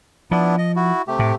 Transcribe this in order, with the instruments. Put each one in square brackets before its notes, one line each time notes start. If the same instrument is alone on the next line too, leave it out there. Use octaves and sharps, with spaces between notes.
[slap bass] F3 [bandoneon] B3 D4 E4
[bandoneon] D#5
E4 F#4
C3 A3 G4
[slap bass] A2